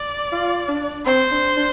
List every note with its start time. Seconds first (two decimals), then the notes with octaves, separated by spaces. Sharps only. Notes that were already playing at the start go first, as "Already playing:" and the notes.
Already playing: D5
0.32 F4
0.68 D4
1.06 C4 C5
1.31 D4
1.57 D4